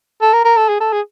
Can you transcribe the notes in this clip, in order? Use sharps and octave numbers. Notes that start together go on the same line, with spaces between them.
A4
A#4
A#4
A4
G#4
A4
G#4